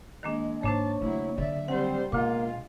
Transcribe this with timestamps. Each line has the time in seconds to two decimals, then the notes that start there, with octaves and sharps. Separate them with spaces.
0.23 D#3 G#3 A#3 D4
0.63 G#2 A#3 D4 C5 C#5 A5
1.02 C#3 F#3 A3 E4
1.38 D3 F#3 D5 E5
1.68 G3 C4 C5 F#5
2.12 D2 B2 G#3 A#3 F4 D6